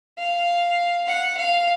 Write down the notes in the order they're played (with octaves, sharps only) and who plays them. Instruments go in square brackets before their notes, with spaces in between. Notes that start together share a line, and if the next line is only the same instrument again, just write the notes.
[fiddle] F5
F#5
F5